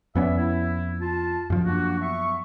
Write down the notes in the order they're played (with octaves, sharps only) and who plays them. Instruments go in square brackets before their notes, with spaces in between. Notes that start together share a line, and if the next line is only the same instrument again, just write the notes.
[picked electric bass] F2 B3 C#4 [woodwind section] D5 E5
[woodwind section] E4
F4 A5
[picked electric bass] F#2 F3
[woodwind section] A#3 D4 F#4
B3 E5 C#6